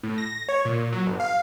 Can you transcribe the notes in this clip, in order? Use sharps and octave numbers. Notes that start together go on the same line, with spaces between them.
A2
A#6
C#5
A#2
F#3
G1
F5